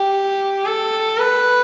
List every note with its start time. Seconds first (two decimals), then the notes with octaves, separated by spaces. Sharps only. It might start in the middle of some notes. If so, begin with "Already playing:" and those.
Already playing: G4
0.66 A4
1.18 B4